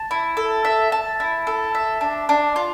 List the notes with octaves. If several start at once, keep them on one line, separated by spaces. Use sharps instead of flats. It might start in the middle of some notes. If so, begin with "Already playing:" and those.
Already playing: A5
E4
A4
E5
A5
E4
A4
E5
D4
D4
F4